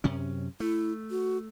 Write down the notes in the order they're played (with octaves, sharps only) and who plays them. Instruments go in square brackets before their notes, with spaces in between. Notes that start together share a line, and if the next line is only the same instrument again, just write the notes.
[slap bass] F#2 C3 C#4
[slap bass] A3 [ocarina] E4
[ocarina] F#4